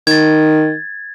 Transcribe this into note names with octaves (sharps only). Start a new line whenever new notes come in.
D#3 G#6 A6